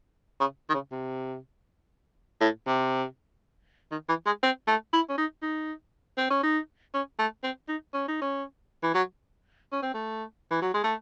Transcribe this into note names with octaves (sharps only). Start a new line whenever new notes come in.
C#3
D#3
C#3
C3
A2
C3
D#3
E3
G#3
C4
A3
E4
C#4
D#4
D#4
C4
C#4
D#4
C#4
A3
C4
D#4
C#4
D#4
C#4
E3
F#3
C#4
C4
A3
E3
F#3
G#3
A3